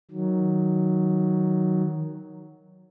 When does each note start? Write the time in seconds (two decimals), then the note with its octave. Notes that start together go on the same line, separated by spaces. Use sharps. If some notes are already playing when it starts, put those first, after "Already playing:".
0.11 D#3 F#3